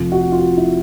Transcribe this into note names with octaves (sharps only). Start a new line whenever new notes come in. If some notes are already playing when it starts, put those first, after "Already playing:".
Already playing: F1 F2 C3 F4
F#4
F4
F#4
E4